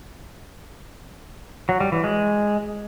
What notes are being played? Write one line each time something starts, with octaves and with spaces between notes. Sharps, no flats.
F#3
G3
E3
G#3